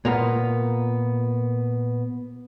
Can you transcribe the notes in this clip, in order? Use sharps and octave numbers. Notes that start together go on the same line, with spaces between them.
A#2 A#3 B3